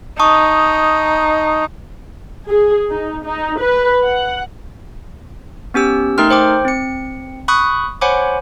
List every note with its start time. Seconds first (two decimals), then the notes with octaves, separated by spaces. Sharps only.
0.19 D#4 A5 C#6 D#6
2.50 G#4
2.91 D#4
3.25 D#4
3.59 B4
4.03 F#5
5.74 B3 C#4 G4 E6
6.18 A3 D#4 A#4 G5 C6 F6
6.30 C5 G5 D6
6.65 C4 C#7
7.48 B5 C#6 D#6 F#6
8.01 C5 C#5 F#5 G#5 B5 D6